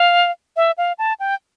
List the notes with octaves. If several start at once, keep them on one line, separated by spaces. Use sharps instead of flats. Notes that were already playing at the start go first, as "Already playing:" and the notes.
Already playing: F5
E5
F5
A5
G5